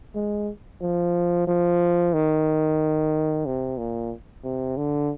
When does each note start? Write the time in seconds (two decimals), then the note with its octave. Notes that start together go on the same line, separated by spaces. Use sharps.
0.15 G#3
0.82 F3
1.48 F3
2.14 D#3
3.46 C3
3.78 A#2
4.44 C3
4.77 D3